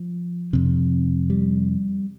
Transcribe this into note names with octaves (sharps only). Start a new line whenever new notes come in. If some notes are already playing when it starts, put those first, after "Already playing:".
Already playing: F3
F2 C3
G3